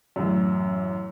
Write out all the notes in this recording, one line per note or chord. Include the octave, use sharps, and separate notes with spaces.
A1 F#2